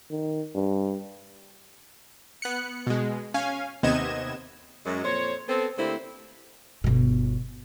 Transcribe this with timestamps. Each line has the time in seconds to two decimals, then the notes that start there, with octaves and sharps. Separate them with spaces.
0.10 D#3
0.55 G2
2.42 B3 F#6 C#7
2.87 B2 G#3
3.34 C#4 F5 G#5
3.83 D#2 C3 B3 D#5 G#6 E7
4.85 F#2 G#3
5.04 F2 A#2 C5 C#5
5.48 B3 C4 A4
5.77 D3 A3 A#3 C4 E4 G4
6.84 G1 B2